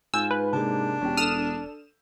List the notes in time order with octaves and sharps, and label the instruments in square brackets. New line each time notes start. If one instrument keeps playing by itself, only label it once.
[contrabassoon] G#2 [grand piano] F4 G#5 G6 [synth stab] E6
[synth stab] B4
[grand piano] C3 G#3 A#3 [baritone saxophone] D4
[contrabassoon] E1 [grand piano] C#4 G4
[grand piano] A4 [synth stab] D#6 F6 E7